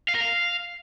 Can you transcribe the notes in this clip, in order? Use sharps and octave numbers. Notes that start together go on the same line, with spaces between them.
F5
A#4
F5